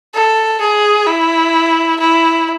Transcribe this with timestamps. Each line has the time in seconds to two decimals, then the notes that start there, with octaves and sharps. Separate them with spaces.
0.14 A4
0.61 G#4
1.07 E4
2.00 E4